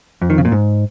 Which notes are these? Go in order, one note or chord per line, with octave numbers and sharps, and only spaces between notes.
F2
D#3
C#3
A#2
G#2